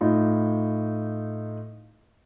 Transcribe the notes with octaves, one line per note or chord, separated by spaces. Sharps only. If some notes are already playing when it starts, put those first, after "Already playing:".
A2 D#4 F4